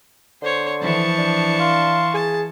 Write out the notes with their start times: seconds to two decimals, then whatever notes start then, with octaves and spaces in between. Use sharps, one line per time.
0.42 D3 C5 C#5
0.82 E3 F3 A5 C#6
1.19 D4
1.59 F5 C6
2.14 G#4 A5